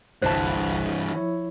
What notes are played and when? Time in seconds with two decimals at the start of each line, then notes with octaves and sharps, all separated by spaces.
0.22 G1 C2 G2 E3 C5 A5 F#6
1.13 F3 E4 C#5